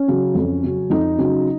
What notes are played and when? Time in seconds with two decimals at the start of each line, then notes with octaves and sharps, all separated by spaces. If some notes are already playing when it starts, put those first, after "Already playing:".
Already playing: C#4
0.08 C#3 F#3
0.35 F2
0.63 C#3 F#3
0.90 F2 D#4
1.19 C#3 F#3